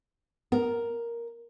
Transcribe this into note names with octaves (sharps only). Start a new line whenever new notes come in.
B3 A#4